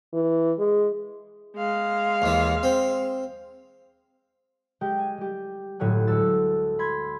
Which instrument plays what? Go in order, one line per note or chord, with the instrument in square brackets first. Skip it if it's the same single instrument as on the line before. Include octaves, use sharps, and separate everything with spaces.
[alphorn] E3
G#3
[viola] G#3 F5
[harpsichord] D#2 E3
C4
[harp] G#3 G4 G5
G#5
G3 G4
G1 A2 F#3 C#5 G#5 F#6
D2 G#3 F#4 A4 E6 A6
B5 C6 G#6